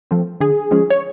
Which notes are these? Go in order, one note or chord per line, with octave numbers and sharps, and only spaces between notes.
F3 A3 C4
D3 G#4
F3 G#3 C#4
C#5